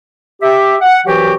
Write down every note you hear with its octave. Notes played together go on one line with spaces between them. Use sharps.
G4 E5
F#5
C2 E3 F#3 F#4 G4